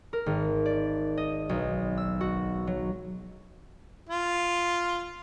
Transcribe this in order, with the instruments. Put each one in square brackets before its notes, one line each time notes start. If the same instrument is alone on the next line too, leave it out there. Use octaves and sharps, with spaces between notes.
[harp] A#4
G#1
D5
D#5
B1
E6
F#4
F#3
[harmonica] F4